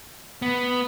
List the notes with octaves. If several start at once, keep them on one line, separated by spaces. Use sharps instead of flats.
B3